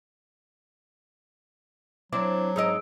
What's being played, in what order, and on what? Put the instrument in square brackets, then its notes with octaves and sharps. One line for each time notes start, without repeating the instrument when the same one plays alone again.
[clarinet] F#3 [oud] C4 D4 E4 [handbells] D6
[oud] G#2 D#4 D#5 [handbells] G#4 E6 D7